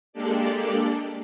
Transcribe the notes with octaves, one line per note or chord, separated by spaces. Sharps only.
G#3 A#3 D4 G4 A4 D5